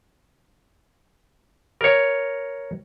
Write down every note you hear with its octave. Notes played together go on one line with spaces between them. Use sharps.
A#4 C#5